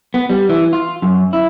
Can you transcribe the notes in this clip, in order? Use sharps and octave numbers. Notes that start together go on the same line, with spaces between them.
B3
G3
E3
F4
F#2
E4